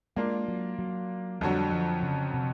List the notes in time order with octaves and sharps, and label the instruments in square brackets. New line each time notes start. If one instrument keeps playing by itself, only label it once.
[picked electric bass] G#3 [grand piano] A#3 D4 F4
[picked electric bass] F#3
F#3
[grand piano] F2 D3 F#3 [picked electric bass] G3
[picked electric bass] F3
C#3
C3